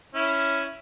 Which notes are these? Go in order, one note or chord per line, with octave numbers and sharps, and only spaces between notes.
C#4 E4